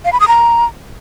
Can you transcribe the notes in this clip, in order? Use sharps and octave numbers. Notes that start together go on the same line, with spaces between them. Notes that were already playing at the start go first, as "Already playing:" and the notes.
F5
B5
D#6
A#5